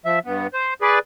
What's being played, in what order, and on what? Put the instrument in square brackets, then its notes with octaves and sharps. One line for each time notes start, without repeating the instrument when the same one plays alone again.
[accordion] F3 E5
G2 B3
C5
G#4 B4 D5